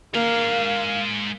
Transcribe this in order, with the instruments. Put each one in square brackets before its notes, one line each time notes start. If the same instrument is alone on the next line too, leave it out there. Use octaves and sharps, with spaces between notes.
[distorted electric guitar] G#3 A#5 [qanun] A#3 [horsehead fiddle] F5